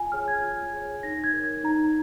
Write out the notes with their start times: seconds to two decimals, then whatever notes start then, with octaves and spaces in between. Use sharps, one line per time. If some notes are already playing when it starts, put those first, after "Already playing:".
Already playing: F4 G#5
0.12 G#4 C#5 F6
0.28 G#6
0.42 F4
0.74 G#4 C#5
1.03 D#4 A#6
1.24 G#6
1.33 A#4 C#5
1.44 G#6
1.64 D#4 A#5